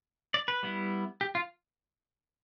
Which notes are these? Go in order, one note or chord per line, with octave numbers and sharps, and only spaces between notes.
D5
B4
G3 B3 E4
G4
F4